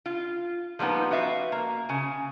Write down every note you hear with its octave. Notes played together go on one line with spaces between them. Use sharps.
F4
F3 G3 A#3 B3 D#4
F#4 B4 E5 F5
A#3
C#3 G#5